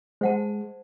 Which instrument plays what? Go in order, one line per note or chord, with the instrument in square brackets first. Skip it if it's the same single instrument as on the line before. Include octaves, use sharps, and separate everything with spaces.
[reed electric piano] G#3 [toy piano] C5 F#5 A5